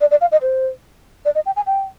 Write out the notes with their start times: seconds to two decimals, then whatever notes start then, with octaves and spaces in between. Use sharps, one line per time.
0.01 D5
0.11 D5
0.21 F5
0.32 D#5
0.42 C5
1.25 D5
1.35 D#5
1.46 G5
1.56 G#5
1.67 G5